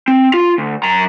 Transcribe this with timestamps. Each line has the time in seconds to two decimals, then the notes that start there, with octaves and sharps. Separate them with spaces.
0.08 C4
0.34 F4
0.58 D2
0.84 F#2 A#5